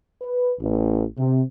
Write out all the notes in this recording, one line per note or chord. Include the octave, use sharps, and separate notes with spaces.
B4
A1
C3